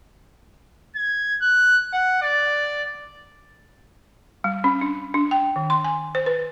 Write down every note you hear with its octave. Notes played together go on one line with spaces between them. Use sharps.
G#6
F#6
F#5
D5
G3
C#4
D4
D4
G5
D#3
C6
G#5
C5
B4